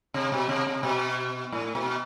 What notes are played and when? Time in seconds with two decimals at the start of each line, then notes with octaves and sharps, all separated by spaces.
0.14 C3
0.32 B2
0.49 C3
0.67 C3
0.83 B2
1.52 A2
1.75 B2